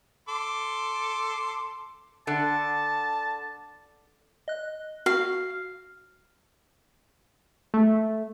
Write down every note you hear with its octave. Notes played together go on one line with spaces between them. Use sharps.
A4 C6 D6
D3 A5
D#5 F#6
F#4 F5
A3